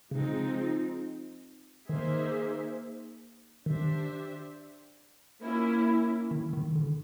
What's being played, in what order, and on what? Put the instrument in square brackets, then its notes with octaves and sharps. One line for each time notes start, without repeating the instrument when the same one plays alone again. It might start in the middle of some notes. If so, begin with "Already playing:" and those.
[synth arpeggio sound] C#3 [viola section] F3 G#3 C4 D#4
[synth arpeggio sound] D#3 [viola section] A#3 D#4 G#4 C5 E5
[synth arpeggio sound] D#3 [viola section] D4 G4 C5 E5
[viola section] A#3 C#4 E4
[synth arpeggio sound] D#3
D#3
D3